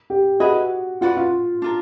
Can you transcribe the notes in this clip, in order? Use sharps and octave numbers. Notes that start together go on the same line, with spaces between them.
G4
E4 F#4 G#4 B4 D#5
F4 F#4 B4 D5 F#5
F4
D4 F4 A#4